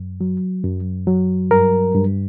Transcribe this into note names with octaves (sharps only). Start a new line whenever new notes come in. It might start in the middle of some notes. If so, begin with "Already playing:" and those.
Already playing: F#2
F#3
F#2
F#3
G2 A#4
G2